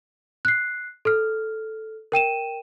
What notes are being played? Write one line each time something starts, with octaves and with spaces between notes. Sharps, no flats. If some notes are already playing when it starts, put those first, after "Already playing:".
F#6 C7
A4 F6
A#4 G5 D#7 E7